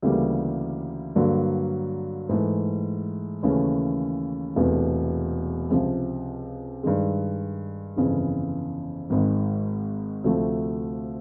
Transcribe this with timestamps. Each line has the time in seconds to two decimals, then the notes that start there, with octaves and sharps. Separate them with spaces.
0.02 D2 C#3 E3 G3 A#3
1.16 G2 D3 F#3 A#3
2.29 G#2 E3 A3
3.43 D#2 C#3 E3 A3 C#4
4.56 E1 E2 C3 E3 A3
5.70 C#2 C3 F3
6.83 G2 D#3 G#3
7.96 G1 F2 C#3 E3
9.10 G#1 G#2 D#3
10.24 D2 C3 F3 A3